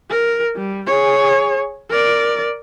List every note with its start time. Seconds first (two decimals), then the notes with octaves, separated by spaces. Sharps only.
0.10 A#4
0.56 G3
0.87 G#4 C#5
1.90 A#4 D5